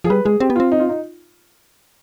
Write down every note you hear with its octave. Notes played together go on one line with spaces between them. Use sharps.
F3 G#4
G3 B4
G#3 G#4
C4 G4
B3
C4 F4
D#4
F4
D#4